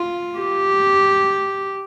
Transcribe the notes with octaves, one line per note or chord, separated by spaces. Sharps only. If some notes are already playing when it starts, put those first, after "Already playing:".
Already playing: F4
G4